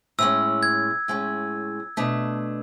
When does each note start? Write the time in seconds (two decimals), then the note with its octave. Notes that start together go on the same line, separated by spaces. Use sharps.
0.18 A2 G#3 C#4 E6
0.63 G#6
1.08 A2 G#3 C#4
1.97 B2 A3 D4